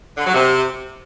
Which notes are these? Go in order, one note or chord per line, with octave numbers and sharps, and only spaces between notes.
D3
F#3
C3